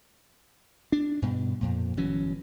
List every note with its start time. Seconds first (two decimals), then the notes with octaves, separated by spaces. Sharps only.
0.92 D4
1.22 G2 B2
1.61 F2 A#2
1.97 G1 E3 F#3 C#4